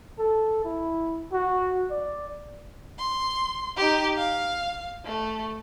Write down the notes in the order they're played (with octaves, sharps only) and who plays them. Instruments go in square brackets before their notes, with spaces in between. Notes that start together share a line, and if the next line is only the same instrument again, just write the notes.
[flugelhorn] A4
E4
F#4
D5
[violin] C6
D#4 G4
F5
A3